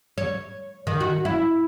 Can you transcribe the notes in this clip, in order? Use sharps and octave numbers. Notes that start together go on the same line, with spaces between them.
C#5
D#3
F#4
E4